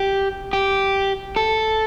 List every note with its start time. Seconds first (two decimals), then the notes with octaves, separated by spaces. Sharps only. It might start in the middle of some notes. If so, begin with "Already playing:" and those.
Already playing: G4
0.53 G4
1.36 A4